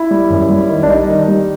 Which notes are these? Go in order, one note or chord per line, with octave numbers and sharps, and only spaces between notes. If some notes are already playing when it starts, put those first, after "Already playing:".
Already playing: E4
G3
F#2
G3
D#3
D4
G3 D#4
D#3
G3